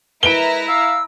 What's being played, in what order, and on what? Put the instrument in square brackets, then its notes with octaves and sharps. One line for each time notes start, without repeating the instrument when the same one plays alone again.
[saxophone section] G#3 A#4 B4 [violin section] E4 A#5 [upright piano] D7 G7
[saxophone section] F5 [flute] E6